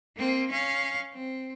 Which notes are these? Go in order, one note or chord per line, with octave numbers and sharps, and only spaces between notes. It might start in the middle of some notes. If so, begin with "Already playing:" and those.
A#3 C4
C#4 F5
C4